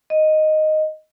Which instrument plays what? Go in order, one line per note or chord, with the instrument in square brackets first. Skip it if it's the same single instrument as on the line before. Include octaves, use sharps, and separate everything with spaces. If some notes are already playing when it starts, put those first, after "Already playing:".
[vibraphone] D#5